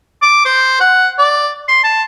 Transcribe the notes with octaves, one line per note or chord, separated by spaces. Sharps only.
D6
C5
F#5
D5
C6
A5